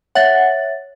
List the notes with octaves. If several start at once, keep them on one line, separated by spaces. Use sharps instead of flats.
C#5 E5 F#5 A6